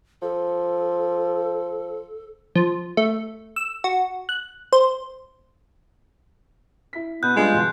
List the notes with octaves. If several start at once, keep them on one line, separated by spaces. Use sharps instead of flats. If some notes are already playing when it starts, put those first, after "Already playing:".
F3 A4
F3
A3
E6
F#4
F#6
C5
E4 B6
B2 B3 B5 F#6 G6
G3 G#3 B3 D4 F4
G1 E2 B2